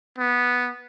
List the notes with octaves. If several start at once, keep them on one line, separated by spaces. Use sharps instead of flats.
B3